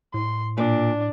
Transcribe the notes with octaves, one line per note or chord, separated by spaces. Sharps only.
A2 C6
A#2 D4